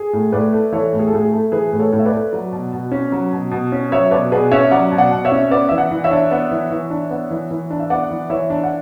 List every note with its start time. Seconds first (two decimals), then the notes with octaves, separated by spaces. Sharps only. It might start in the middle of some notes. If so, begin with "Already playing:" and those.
Already playing: G#4
0.13 A2
0.32 A2 B4 D5
0.52 A3
0.72 E3 A4 C#5
0.93 A2
0.99 G#4
1.07 A4
1.13 A2 G#4
1.32 A3
1.52 E3 G#4 B4
1.72 A2
1.79 A4 C#5
1.92 A2
1.99 E5
2.05 B4 D5
2.12 A3
2.33 F#3
2.53 B2
2.73 B2
2.92 C#4
3.12 F#3
3.33 B2
3.51 B2
3.72 C#4
3.92 F#3 C#5 E5
4.11 B2 B4 D5
4.32 B2 G#4 B4
4.52 C#4 C#5 E5
4.71 F#3 D5 F#5
4.92 B2
4.98 D5 F#5
5.11 B2
5.25 C#5 E5
5.32 C#4
5.51 B3 B4 D5
5.69 E3 E5
5.78 D5 F#5
5.91 E3
6.04 C#5 E5
6.11 D4
6.31 B3
6.51 E3
6.70 E3
6.90 D4
7.10 B3
7.31 E3
7.51 E3
7.70 D4
7.80 E5
7.90 B3 D5 F#5
8.11 E3
8.30 E3 C#5 E5
8.50 D4
8.63 F#5